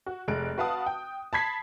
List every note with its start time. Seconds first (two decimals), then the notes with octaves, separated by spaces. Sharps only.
0.06 F#4
0.28 F1 C3 G#3 F#6 D7
0.58 F#4 B4 F5 F#5 A5 D#6
0.86 G5
1.33 A5 B5 G#6 B6 C7